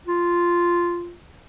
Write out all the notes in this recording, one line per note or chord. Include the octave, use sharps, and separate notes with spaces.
F4